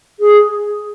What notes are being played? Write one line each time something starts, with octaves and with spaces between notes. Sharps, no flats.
G#4